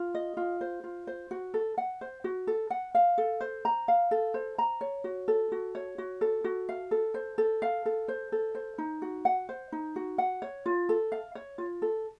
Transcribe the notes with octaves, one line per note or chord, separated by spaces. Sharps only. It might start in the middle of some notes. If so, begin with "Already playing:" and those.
Already playing: F4
D#5
F4
C5
F4
C5
F#4
A4
F#5
C5
F#4
A4
F#5
F5
A4
C5
A#5
F5
A4
C5
A#5
C#5
F#4
A4
F#4
C#5
F#4
A4
F#4
F5
A4
C5
A4
F5
A4
C5
A4
C5
D#4
F#4
F#5
C5
D#4
F#4
F#5
C#5
F4
A4
F5
C#5
F4
A4